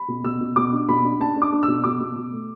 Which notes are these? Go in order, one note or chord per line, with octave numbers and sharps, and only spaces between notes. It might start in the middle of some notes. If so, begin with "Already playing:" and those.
Already playing: B5
B2
B2 E6
B2
B2 D6
D4
B2 B5
D4
D4 A5
D4
D6
D4
E6
B2
B2 D6
B2
B2
A3